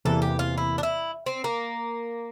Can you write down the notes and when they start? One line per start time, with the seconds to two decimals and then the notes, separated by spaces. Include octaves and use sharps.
0.05 E2 C3 E3 A#3 A4
0.22 G4
0.39 F4
0.58 E4
0.78 D4
0.83 E4
1.26 C4
1.44 A#3